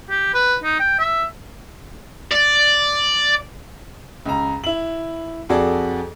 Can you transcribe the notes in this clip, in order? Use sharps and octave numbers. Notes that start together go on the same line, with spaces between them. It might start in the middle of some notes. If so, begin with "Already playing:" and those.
G4
B4
D#4
G5
E5
D5
C#2 A#5
E4 F#7
F2 F#4 G#4 A4 D5